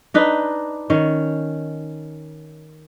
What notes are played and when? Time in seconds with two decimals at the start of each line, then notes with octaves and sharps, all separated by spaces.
0.14 D4 D#4 B4
0.90 D#3 C#4